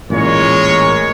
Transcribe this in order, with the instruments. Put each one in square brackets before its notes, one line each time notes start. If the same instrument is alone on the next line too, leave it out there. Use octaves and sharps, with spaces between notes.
[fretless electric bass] A1 A#2 [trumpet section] G#3 A#4 C#5